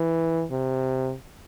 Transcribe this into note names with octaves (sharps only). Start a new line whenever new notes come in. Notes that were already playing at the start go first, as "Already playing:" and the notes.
Already playing: E3
C3